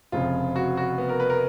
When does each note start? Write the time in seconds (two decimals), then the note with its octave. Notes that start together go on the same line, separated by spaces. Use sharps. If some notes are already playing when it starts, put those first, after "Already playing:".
0.12 F1 F2 C#3 F3 F4
0.56 F#4
0.77 F#4
0.98 B3
1.09 A#4
1.20 B4
1.30 A#4